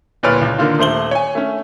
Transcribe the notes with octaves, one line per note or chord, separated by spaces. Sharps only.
D1 A#2 B4 C#5 F6
C#2
D3 D#3 A#3 F4
D#1 A3 C5 F#7 G7
C#5 G#5
A3 C#4